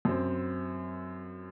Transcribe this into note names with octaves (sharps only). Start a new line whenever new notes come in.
F#2 F#3 C4